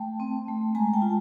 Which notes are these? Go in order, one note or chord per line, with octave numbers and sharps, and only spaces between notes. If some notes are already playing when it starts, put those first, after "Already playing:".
Already playing: A3 G5 A5
C4
A3
G#3 G#5 A#5
G5 A5
F4